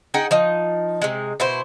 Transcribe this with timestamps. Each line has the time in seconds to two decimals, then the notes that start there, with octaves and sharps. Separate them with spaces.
0.14 D#4 G#4 F#5 G5
0.31 F3 D#4
1.02 C3 G#3
1.40 B2 E4 C5